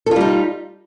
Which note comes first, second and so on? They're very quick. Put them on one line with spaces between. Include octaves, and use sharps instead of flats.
A4 F4 G3 D#4